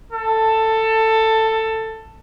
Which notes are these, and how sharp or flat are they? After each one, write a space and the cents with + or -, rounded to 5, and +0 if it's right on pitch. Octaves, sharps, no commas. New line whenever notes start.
A4 +15